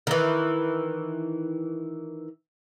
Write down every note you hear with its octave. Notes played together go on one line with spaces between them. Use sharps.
D#3 E3